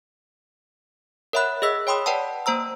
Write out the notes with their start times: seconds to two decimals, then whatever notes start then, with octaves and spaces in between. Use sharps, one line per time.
1.33 A#4 C#5 E5 F#5 B5 F#6
1.62 G#4 D#5 E6 B6
1.87 C#5 G5 B5 C6 D#6
2.06 B4 D5 F#5 G5 A5
2.46 A#3 C5 A#5 E6